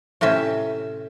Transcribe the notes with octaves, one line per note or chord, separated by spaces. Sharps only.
A2 C3 C4 C#4 E5